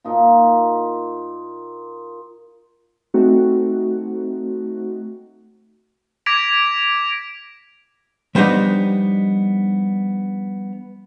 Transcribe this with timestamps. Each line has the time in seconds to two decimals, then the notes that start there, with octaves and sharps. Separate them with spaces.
0.04 A#2 D#4 F4
3.14 A3 C4 D#4 F#4
6.26 D6 G#6 A#6 B6 D7 F7
8.35 F3 G3 B3 D4 D#4